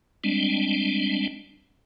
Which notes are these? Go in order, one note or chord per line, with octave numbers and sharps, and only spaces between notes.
G3 G#3 C4 D4